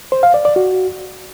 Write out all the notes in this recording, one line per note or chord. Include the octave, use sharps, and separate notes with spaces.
C5
F5
D5
D5
F#4